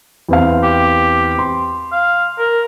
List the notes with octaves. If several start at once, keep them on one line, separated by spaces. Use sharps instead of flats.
E2 C4 F5
G4
C6
F5
A#4